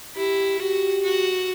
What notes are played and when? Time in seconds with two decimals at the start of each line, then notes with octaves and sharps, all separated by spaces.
0.17 E4 G4
0.60 F#4 G4
1.03 F#4